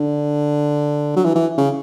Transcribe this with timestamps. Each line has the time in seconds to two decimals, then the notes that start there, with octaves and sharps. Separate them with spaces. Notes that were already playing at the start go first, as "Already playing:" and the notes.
Already playing: D3
1.16 F#3
1.25 E3
1.36 E3
1.58 C#3